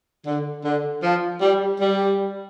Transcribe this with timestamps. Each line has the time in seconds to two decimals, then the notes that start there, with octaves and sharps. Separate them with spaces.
0.27 D3
0.64 D3
1.03 F3
1.42 G3
1.80 G3